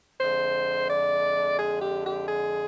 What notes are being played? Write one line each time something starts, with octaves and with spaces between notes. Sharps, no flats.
F2 D3 G#3 C5
D5
G#4
G4
G4
G#4